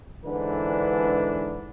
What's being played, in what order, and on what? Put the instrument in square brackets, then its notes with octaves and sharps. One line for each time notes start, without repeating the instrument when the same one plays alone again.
[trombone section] G#2 D3 E3 D4 B4